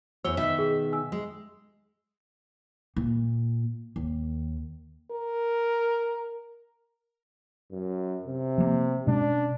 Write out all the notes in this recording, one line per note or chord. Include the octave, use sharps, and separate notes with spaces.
E2 C#5 E6 G7
B2 D#3 E5
G#4
G#5 E6
G#3
A#2
D#2
A#4
F#2
C3
F3 A#3
B2 G#3 C#4 D4